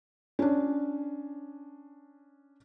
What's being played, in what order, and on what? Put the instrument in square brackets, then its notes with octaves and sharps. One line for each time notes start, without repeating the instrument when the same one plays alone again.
[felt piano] C#4 D4